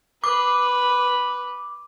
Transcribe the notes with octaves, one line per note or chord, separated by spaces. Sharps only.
B4 D6